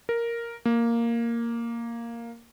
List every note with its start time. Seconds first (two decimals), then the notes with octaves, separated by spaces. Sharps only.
0.09 A#4
0.65 A#3